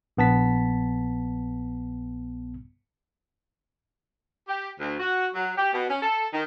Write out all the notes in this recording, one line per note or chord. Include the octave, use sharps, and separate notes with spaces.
A#1 B3 A5 B6
G4
D2
F#4
F#3
G4
B2
C#4
A4
D#3